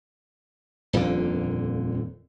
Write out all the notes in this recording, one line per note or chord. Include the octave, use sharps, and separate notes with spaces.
D#1 F2 A#2 D3